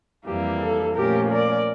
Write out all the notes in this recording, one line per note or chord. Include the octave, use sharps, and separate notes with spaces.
F2 E3 G3 A#3 G4
A4
A#2 F3 A3 C#4 G4 A#4
A#4 D5